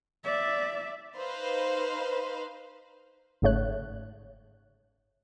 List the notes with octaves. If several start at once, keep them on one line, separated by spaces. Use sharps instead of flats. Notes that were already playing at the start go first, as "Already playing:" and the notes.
D5 E5
D#4 B4 C5 F5
G1 G#2 C#3 A3 C#5 F#6